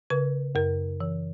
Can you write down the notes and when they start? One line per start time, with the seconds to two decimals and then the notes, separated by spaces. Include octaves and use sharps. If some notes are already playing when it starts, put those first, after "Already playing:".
0.10 C#3 B4
0.55 F#2 A#4
1.00 E3